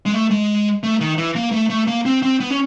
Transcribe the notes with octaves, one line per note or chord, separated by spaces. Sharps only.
G#3
A3
G#3
A3
D#3
E3
A#3
A3
A3
A#3
C4
C4
B3
C#4